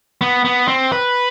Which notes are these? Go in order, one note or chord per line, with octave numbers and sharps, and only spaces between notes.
B3
B3
C4
B4